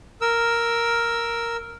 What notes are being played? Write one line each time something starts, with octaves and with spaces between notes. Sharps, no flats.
A#4 E6